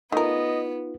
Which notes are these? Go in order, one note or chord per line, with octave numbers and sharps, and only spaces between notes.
A3 B3 D#4 F4 A#4 D#5